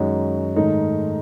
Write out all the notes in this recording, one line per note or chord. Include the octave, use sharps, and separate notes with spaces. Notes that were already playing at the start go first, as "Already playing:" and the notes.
Already playing: F#2 D#3 G#3 D#4 F#4
G#2 D#3 A3 D#4